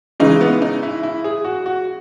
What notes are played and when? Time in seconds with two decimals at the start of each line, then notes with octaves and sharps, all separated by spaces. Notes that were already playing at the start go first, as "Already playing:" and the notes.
0.20 C#3 E3 G#3 D#4
0.41 B3
0.62 D#4
0.83 E4
1.03 E4
1.24 G#4
1.44 F#4
1.66 F#4